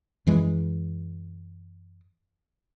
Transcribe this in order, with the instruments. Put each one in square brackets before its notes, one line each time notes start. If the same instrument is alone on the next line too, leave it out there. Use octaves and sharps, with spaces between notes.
[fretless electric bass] F#2 E3 G#3